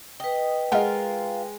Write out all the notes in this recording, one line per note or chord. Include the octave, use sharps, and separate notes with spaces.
B4 D#5 G5
G#3 F4 A#4 D#5 F5 F#5